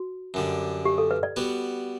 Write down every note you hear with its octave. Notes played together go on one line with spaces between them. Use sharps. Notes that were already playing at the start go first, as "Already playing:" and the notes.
Already playing: F#4
F#2 D3 G3
G4
A4
B4
D5
G3 B3 F#4